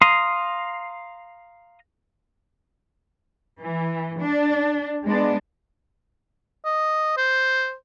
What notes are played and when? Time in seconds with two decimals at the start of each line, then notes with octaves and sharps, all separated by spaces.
0.02 F5 A#5 C6 D#6
3.60 E3
4.20 D4
5.06 G#3 B3 D4
6.65 D#5
7.17 C5